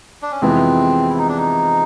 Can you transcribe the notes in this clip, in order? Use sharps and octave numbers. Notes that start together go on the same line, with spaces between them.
D4
C#4
F2 C3 E3 G#3 B3 C4
E4
D#4
D4
D#4